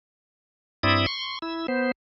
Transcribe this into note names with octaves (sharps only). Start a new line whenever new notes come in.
G2 C4 E4 D5 E5 D#6
C6 C#6
E4 E6
B3 C5